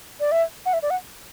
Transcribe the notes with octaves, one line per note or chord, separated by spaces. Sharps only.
D5
E5
F#5
E5
D5
F#5